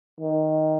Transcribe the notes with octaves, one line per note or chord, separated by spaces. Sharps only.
D#3